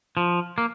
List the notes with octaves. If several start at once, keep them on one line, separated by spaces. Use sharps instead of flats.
F3
A#3